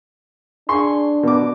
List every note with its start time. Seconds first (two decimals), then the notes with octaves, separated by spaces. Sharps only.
0.69 D4 G#4 C6 C#6
1.23 B2 D6